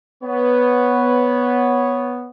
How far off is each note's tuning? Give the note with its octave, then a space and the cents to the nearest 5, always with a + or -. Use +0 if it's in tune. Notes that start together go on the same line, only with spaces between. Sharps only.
B3 +0 C#5 +0